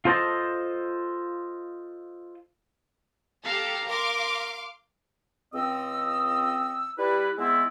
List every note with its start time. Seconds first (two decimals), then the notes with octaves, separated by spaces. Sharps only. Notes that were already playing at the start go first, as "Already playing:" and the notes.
0.05 F4 A4 C5 D5 D#5 A5
3.45 G4 A4 F5 A#5
3.89 A#4 F5 C6 D6
5.53 C#2 C4 D#5 E6
6.98 G3 E4 B4
7.38 G#3 B3 C4 E4